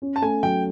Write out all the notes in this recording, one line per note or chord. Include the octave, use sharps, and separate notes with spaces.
C#4
A5
A3 G#5
F#3 G5